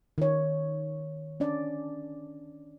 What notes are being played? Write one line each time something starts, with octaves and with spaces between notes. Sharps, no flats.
D#3 C#5
C#4 D4 D5